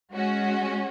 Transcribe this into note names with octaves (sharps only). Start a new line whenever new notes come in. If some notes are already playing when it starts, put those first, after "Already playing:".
G#3 C#4 F#4